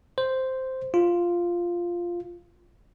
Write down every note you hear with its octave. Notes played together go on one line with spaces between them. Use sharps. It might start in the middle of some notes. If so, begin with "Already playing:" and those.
C5
F4